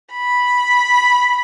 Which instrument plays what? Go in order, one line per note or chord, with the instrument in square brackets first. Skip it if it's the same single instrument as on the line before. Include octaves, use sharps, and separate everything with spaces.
[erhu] B5